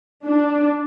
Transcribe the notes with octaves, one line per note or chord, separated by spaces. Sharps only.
D4